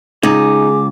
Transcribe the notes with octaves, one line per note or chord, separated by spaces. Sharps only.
C#2 D#4 G#4 D6